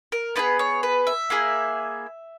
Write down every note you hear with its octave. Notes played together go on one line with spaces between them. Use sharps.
A#4
B3 D#4 G#4 B4
C#5
B4
E5
A#3 E4 G#4